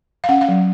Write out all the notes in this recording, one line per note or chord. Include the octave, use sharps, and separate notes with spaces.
F5
C#4 F#5
F5
F#3